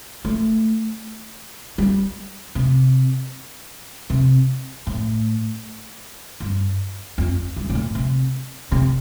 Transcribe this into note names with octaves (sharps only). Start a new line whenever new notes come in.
A3
G3
C3
C3
A2
G2
F2
G2
C3
A2
C3
C3